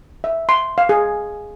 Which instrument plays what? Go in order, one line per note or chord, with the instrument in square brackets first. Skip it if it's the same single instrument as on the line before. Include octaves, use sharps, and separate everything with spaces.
[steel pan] E5
C6
F5
G#4